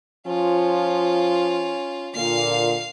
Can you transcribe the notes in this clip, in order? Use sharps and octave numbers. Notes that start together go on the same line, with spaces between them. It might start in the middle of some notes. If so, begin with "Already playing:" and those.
F3 C#4 F4
A#2 D3 F5 C7